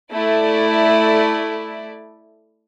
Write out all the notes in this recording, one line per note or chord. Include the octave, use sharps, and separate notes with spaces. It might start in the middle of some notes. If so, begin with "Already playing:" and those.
A3 E4 D5